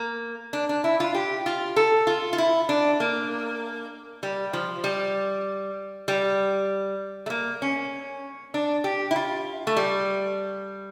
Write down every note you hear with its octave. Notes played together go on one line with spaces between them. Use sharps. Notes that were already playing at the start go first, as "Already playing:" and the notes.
Already playing: A#3
D4
D4
E4
F4
G4
F4
A4
F4
F4
E4
D4
A#3
G3
F3
G3
G3
A3
A#3
C#4
D4
G4
E4
F4
A3
G3